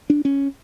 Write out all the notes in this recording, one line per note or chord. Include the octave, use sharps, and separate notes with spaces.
D4
C#4